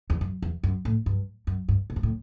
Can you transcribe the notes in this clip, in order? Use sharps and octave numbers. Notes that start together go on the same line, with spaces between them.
E2
F#2
E2
F#2
A2
G2
F#2
G2
A2
G2
A2